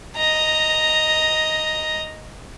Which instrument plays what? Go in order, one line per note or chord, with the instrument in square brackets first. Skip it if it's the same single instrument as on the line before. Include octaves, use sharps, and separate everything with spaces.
[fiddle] D#5 A#5